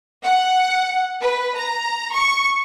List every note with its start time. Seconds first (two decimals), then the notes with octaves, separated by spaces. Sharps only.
0.24 F#5
1.22 B4
1.57 A#5
2.13 C#6